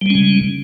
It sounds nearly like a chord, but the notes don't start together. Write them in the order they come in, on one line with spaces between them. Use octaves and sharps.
G3 G#3 C#4 C#3